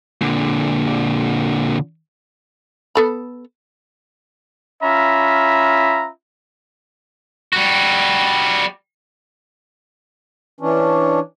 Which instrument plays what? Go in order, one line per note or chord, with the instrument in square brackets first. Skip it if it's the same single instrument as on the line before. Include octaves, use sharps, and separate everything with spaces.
[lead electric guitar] A#2 D3
[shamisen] B3 A4 B5
[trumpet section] C#4 F4 E5 A#5 B5
[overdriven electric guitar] G3 F#4
[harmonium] E3 C#4 D4